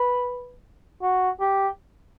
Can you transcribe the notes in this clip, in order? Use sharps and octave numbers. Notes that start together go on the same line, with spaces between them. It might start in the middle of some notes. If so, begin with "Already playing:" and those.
Already playing: B4
F#4
G4